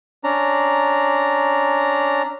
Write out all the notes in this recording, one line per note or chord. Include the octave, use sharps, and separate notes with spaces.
C#4 D4 A#5